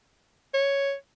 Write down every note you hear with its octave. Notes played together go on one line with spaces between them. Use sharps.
C#5